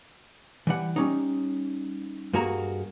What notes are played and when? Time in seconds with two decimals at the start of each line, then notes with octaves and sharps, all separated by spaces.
0.67 E3 G3 F#5
0.96 G3 C#4 D#4
2.33 G2 A#3 F#4 G#4 A#5